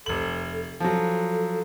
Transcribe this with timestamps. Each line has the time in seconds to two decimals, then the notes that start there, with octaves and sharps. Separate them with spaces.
0.06 F1 A4 F#7
0.80 F3 F#3 A4